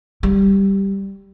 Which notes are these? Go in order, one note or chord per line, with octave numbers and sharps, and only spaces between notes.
G3